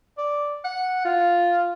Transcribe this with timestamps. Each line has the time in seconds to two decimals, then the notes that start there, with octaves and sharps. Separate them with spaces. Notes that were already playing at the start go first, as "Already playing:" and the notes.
0.18 D5
0.64 F#5
1.04 F4